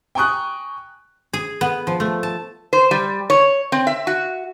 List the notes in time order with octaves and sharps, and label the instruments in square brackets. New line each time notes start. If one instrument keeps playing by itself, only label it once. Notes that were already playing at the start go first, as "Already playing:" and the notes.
[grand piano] G5 G#5 A#5 C#6 D#6 F#6
[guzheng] G#4
B3
F3
A3
A5
[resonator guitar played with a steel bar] C5
G3
C#5
C4
E5
F#4